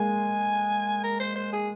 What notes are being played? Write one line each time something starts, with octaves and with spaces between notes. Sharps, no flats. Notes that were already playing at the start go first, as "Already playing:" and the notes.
Already playing: G#3 A#3 G#5
A#4
C5
C5
G#4